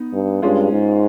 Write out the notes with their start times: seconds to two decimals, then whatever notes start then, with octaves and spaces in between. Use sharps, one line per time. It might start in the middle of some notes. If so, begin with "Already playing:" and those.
Already playing: B3 D#4
0.13 G2
0.42 G2 G#3 C#4 F4
0.72 G#2